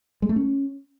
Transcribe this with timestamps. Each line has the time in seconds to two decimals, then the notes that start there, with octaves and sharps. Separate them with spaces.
0.22 G#3
0.29 A3
0.36 C#4